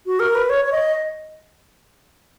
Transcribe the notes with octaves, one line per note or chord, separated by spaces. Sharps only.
F#4
A#4
B4
C#5
C#5
D#5